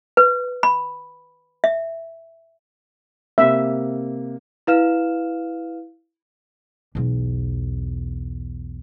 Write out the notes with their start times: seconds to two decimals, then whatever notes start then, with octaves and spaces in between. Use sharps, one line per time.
0.17 B4
0.63 B5
1.64 E5
3.38 C3 A#3 E5
4.67 E4 B4 F5 F6 E7
6.95 B1 E2